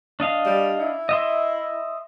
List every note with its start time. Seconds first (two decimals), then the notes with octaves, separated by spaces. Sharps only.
0.20 D4 D#5 F5
0.46 G3
0.79 E4
1.09 D#5 E5 C6